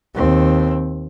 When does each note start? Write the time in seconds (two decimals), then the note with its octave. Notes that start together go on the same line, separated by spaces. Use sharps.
0.15 D#2 C4